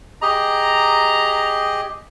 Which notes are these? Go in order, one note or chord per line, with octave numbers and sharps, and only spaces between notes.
G4 G#4 D#5 A#5